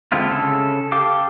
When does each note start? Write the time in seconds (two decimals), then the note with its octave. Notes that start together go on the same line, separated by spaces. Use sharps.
0.12 D3 G#3 C4 E4 F4
0.31 C#3 A4
0.92 G4 A4 F5 D6